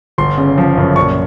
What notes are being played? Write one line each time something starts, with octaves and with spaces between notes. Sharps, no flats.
G1 C6
C#3
F3
F#2
A#1 C#6